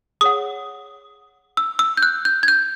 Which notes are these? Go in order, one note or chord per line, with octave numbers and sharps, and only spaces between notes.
G#4 C#5 F#5 D#6
E6
E6
G6
F#6
G6
G#6
G6